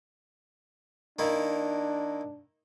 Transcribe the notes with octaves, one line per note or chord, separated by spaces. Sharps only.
D#3 A#3 D4 E4